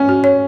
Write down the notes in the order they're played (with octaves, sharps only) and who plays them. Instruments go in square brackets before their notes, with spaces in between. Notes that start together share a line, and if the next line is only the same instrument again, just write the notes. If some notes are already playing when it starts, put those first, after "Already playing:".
Already playing: [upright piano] C#4
[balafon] F#4
C#5